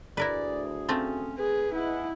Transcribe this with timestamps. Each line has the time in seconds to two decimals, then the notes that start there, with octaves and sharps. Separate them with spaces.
0.17 D2 E4 G#4 A#4 B4 D5
0.89 A3 C4 C#4 F4
1.38 G#4 B4
1.74 E4 G#4 D#5 F#5